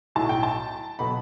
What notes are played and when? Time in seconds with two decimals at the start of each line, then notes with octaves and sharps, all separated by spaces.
0.15 B1 A2 F#3 A5
0.29 G5
0.43 A5
0.99 B2 F#3 B5